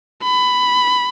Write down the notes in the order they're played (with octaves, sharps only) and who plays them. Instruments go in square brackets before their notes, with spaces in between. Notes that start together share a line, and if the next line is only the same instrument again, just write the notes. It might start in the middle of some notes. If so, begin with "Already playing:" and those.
[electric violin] B5